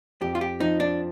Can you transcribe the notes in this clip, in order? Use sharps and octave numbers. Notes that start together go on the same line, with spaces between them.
F2 G4
F4
G4
F3 D#4
D4